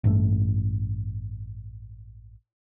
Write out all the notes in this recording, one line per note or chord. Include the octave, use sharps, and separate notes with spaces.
A1 G2 A3